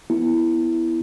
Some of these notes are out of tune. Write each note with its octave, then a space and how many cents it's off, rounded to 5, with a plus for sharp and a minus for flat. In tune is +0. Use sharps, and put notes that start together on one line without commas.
B3 +0 E4 +0